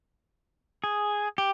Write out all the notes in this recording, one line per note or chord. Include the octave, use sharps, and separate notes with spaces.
G#4
G4